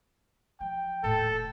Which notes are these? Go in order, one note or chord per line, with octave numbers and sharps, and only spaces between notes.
F3 G5
D#1 A2 A4